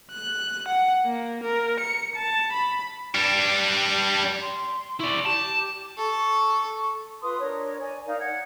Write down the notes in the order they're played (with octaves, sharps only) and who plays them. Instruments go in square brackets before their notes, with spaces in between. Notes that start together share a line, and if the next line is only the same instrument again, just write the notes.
[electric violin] F#6
F#5
A#3
A#4
C#7
A5
B5
[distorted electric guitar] G3 D4
[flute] C6
[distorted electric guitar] E4 D5 [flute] C#6
[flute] G4 [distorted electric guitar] A5
[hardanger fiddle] A4 [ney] C#6
[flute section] F4 B4 C6 D#6
D4 A#4 C#5
C#5 D5 G#5
D#4 A#4 D5 F5
F#5 G#6